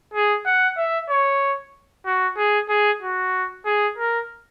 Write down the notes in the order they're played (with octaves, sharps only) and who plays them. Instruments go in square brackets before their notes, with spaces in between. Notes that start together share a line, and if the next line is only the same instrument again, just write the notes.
[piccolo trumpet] G#4
F#5
E5
C#5
F#4
G#4
G#4
F#4
G#4
A#4